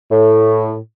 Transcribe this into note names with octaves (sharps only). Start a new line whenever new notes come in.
A2